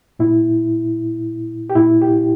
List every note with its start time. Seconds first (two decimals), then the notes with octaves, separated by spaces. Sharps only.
0.19 A#2 E4
1.70 G4
1.75 A#2 E4
2.02 G4